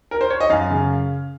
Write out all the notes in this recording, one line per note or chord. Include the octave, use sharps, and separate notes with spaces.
A#4
C5
C#5
D#5
F#2 F5
C#3